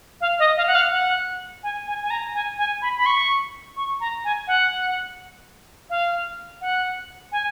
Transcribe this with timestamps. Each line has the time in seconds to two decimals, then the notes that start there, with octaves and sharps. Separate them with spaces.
0.21 F5
0.39 D#5
0.57 F5
0.67 F#5
0.75 F5
0.92 F#5
1.63 G#5
1.87 G#5
2.02 G#5
2.10 A#5
2.34 G#5
2.58 G#5
2.82 B5
2.97 B5
3.06 C#6
3.77 C#6
4.00 A#5
4.24 G#5
4.47 F#5
5.90 F5
6.61 F#5
7.32 G#5